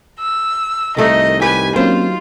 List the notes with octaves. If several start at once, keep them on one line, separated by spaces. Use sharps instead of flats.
E6
C2 D#3 A3 D#4 D#5
G4 B4 G#5 B6
F#3 A#3 C4 C#4 F4 C5